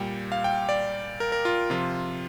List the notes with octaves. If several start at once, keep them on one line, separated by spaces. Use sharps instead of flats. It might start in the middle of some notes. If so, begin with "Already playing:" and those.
Already playing: A#2 G3 G5
F5
G5
D5
A#4
A#4
F4
C3 F3 F4